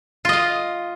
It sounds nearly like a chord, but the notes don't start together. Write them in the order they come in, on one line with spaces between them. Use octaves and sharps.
F4 D#5 F5